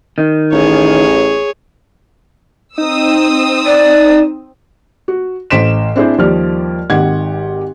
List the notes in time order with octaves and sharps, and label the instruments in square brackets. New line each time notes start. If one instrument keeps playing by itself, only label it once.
[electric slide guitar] D#3
[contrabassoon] A1 [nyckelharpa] G#4 C#5
[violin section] C4 D#6 E6 [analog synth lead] D#4
[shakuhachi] D5
[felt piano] F#4
A1 C5 C6 B6 D7 E7
C4 D4 E4 G#4 C5
D#2 F3 G3 D5 F6
G#1 D#3 G4 F#5 G#6